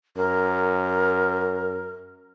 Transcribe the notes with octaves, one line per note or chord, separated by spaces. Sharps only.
F#2 A#4